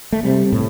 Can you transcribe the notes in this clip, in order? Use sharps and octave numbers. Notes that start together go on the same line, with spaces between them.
A3
C3 G3
A2